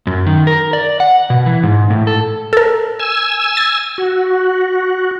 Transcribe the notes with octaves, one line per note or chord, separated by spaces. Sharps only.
F#2
D#3
A#4
D5
F#5
B2
E3
G#2
A2
A4
A4 A#4
G#5 E6
A6
F#4